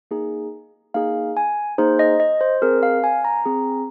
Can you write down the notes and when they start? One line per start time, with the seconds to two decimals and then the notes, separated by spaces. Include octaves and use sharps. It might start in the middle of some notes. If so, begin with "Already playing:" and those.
0.11 A#3 D#4 G#4
0.94 A#3 D#4 G#4 F5
1.37 G#5
1.78 A#3 D#4 G#4 C5
1.99 D#5
2.20 D#5
2.41 C5
2.62 C4 G#4 A#4
2.83 F5
3.04 G#5
3.25 A#5
3.46 C4 G#4